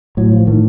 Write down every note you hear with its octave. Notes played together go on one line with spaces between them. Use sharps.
A2 F#3
F3
A2 D#3